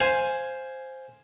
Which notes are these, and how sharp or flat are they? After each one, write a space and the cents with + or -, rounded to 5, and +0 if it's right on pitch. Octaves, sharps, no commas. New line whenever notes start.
C5 +0 F5 +0 G#5 +0